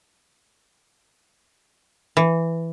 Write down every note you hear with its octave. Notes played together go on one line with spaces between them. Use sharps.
E3